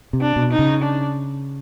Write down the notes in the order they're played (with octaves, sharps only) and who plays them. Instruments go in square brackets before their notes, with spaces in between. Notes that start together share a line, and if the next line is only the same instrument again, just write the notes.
[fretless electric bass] C3
[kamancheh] D4
[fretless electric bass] B2
[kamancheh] D#4
[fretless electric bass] C#3
[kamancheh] D4